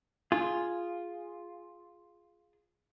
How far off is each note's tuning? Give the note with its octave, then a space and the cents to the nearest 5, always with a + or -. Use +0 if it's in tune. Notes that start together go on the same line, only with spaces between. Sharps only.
F4 +0 G#4 +0